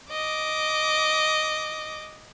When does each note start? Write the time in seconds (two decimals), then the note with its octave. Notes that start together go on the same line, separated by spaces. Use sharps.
0.12 D#5 D6